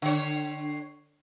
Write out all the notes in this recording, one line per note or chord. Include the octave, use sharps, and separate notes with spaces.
D3 C#5